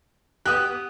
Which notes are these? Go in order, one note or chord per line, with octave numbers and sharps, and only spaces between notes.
B3 G4 D#6 F#6